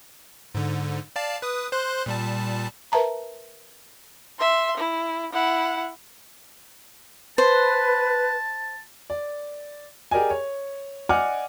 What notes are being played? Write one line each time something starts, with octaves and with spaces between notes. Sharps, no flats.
G#2 D3
D5 F5 A5
B4 D#6
C5 C6 F#6
A#2 G3 A5
A#4 B4 E5 A5 A#5
E5 C6
E4
E4 F#5
B4 C5 A5
D5
G4 G#4 A#4 D5 D#5 G#5
C#5
D5 D#5 F#5 G#5 D6 F6